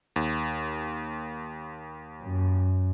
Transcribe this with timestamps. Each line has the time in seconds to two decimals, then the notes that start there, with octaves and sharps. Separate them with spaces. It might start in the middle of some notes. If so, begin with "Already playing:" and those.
0.16 D#2
2.23 F#2